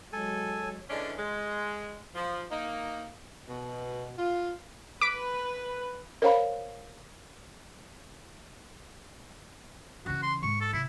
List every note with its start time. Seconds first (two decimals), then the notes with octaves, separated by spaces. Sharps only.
0.13 F#3 G#3 A4 G#5
0.89 D3 E3 G#3 C#4 D4
1.18 G#3
2.15 F3
2.51 A#3 D#4
3.48 B2
4.18 F4
5.01 B4 D6 B6 D7
6.22 A#4 C5 C#5 F5 A#5 B5
10.06 C#3 E3 F#4
10.22 C6
10.42 G#2 C#6
10.61 A4
10.73 C3 E4